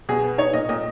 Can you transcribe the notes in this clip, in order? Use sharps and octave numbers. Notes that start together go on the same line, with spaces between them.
B2 G#4
B3
D#4 C#5
A#2 D#5
A#2 D#5